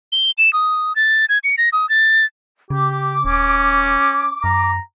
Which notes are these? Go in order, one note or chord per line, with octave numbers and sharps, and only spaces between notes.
G7
E7
D#6
A6
G#6
C#7
A#6
D#6
A6
C#3 G4 D6
D#1 C#4
F#2 A#5